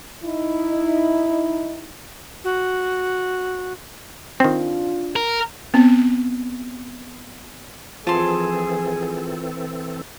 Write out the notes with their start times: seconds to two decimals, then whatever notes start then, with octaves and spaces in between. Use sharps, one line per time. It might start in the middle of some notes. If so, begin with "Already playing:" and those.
0.24 D#4 E4
2.44 F#4
4.40 D#3 C4 D4 F4
5.16 A#4
5.74 B3 C4
8.07 E3 F3 C4 G#4 A4 A5 C6